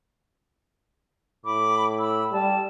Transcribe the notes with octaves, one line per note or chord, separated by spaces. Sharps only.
A2 B5 D6
B5 E6
G3 A5